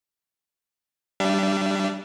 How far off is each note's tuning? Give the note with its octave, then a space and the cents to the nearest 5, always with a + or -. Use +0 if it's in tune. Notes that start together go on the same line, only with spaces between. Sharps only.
G3 -15 D4 +0 E5 +45